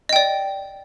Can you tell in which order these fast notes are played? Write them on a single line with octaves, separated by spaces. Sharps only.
D#5 G5 D5